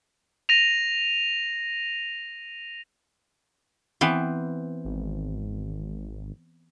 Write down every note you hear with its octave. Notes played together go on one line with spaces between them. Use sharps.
A#6 D#7 F7
E3 B3 C4
G#1